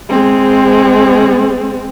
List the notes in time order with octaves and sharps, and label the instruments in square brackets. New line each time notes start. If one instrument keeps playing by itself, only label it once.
[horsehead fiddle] G#3 C4